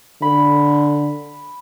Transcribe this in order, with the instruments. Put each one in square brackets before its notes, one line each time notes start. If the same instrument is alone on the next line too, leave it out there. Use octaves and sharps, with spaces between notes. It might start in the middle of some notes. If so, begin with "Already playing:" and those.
[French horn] D3 [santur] B5